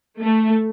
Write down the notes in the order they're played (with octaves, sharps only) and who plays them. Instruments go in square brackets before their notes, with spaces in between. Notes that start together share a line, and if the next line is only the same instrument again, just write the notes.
[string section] A3